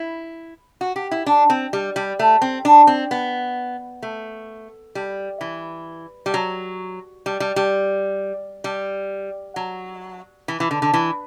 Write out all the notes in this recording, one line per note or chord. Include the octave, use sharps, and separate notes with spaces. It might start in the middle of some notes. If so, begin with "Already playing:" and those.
Already playing: E4
F#4
G4
E4
D4
C4
G3
G3
A3
C4
D4
C4
B3
A3
G3
E3
G3
F#3
G3
G3
G3
G3
F#3
E3
E3
D3
D3
E3